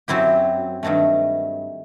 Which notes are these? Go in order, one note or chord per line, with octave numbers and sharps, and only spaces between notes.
F#2 F#3 C4 E4 G4
G2 D#3 F#3 A3